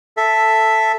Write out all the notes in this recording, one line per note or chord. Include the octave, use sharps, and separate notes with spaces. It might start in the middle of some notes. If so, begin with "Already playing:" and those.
A4 E5